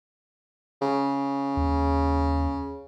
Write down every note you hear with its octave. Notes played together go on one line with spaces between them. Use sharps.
C#3
D#2